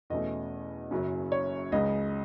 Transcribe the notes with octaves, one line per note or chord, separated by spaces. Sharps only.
E2 B2 A3 C#4 D#5
F#1 F#2 C#3 F#3 C#4
C#5
C#2 C#3 G#3 D#5